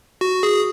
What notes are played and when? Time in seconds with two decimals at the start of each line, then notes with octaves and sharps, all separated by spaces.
0.21 F#4
0.43 G#4